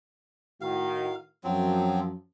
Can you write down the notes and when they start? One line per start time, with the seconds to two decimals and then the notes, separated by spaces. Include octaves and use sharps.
0.61 A2 D#3 F#4 F5
1.44 F#2 F3 F#3 C4